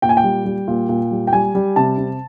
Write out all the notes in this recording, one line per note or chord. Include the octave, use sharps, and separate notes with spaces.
A#2 G5
G#5
G5
G3
G3
A#2
A#2
G3
G5
G3 G#5
G3
C3 A5
C3